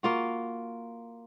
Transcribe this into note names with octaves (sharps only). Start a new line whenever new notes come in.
A#3 F4 F#4